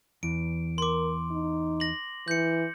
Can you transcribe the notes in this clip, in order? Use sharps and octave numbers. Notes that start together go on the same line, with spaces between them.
E2 E3 D7
A#4 C6 D6
D#4
A#6 F#7
E3 G6 C#7